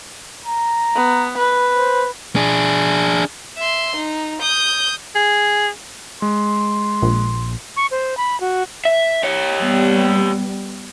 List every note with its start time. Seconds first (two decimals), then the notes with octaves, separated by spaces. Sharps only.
0.45 A#5
0.95 B3
1.37 B4
1.74 C5
2.36 D4 G#4
3.58 E5 C6
3.96 D#4
4.42 D#6 G6
5.16 G#4
6.22 G#3 C6
7.02 A#1
7.76 C#6
7.91 C5
8.17 B5
8.40 F#4
8.85 E5
9.23 G4 C#5
9.61 G3 B3